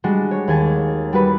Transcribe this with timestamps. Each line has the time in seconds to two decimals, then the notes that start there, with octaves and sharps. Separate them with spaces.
0.04 G3 G#3 D4 F#4
0.31 C#5
0.48 D#2 G#4 G#5 A5
1.13 G3 F#4 B4